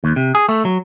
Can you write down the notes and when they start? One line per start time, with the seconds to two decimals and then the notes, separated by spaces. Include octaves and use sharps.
0.04 D#2
0.16 C3
0.35 G#4
0.49 A3
0.65 F#3